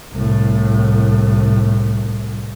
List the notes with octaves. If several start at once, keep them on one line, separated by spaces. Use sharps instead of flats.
C2 A2